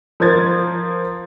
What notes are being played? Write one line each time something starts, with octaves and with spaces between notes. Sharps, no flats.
F3 A#4 C5 G#6 A6